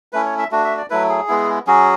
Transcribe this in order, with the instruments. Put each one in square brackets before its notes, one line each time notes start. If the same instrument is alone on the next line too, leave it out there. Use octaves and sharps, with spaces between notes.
[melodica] A3 C#4 E4 B4
C#5
E5
A3 D4 F#4
E5
D5
F#3 A3 E4 B4
G#4
G#3 B3 E4
F#3 C#4 F#4 G#4